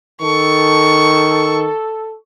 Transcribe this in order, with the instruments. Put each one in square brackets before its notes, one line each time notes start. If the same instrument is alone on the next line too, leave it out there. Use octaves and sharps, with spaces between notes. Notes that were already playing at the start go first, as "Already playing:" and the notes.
[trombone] D#3 [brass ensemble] A4 [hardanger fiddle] C#6